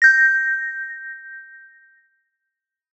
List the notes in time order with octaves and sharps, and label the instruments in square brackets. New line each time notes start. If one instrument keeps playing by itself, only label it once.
[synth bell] G6 A#6